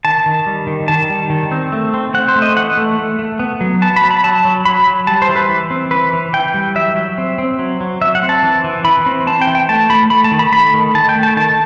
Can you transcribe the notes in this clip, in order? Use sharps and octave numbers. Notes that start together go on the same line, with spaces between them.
D#3 A5
D#3
G3
D#3
D#3 A5
G3
D#3
C4
A3
C4
C4 F#5
C5
A3
D#5
E3 F#5
A3
A3
A3
B3
F#3
B3 A5
B5
F#3 A5
B5
F#3 A5
F#3
F#3 B5
F#3
G3 A5
C5
E3
B4
E3
C4
E3 B4
E3
E3 G5
G3
F#3 E5
F#3
C4
C4
F#3
F#3
F#3 E5
F#5
C4
A5
E3
E3
E3 B5
C4
C4 A5
G5
E3
G5
A3 A5
A3 B5
A3 B5
A5
D#3
B5
A3 B5
D#3
D#3 A5
G5
A3
A5
D#3 A5